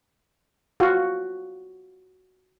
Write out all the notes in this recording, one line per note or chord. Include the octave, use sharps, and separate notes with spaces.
F4 F#4